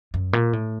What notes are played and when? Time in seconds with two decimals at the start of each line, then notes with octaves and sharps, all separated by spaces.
0.14 F#2
0.33 A#2
0.53 A2